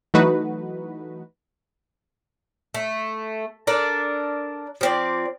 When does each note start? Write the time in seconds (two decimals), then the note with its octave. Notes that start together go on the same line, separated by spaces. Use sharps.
0.14 E3 F#3 A3 D#4 F#4 B4
2.74 A3
3.67 D4 A4 A#4 D5
4.81 F3 C4 D5